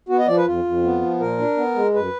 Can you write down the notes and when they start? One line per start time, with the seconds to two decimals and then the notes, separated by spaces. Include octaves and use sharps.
0.09 B3 F#4
0.19 D#5
0.27 F3 D5
0.37 B4
0.46 F2 F4
0.64 F2
0.84 B3
1.02 F3
1.20 A#2 A#4
1.38 D4
1.57 B3
1.75 G#3
1.94 F#2 B4